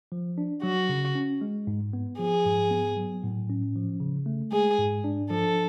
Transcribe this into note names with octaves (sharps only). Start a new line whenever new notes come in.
F3
D4
F#3 F#4
C#3
C#4
G#3
G#2
B3
F3 G#4
G#2
B3
F#3
A2
C#4
F3
C#3
A3
G#3 G#4
G#2
D4
F3 A4